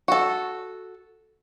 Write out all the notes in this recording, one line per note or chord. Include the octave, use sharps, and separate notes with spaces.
F#4 A4